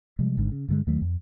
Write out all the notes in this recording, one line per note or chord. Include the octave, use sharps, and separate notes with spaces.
C3 F3 G3 G#3
G#1 G#2 D3
C#3
G2 D3 G#3
D#2 D#3 F#3 A3
F2